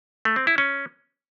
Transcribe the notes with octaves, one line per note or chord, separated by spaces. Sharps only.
A3
C4
E4
C#4